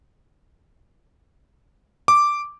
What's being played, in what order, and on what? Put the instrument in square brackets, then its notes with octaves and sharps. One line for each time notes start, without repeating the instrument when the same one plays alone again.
[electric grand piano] D6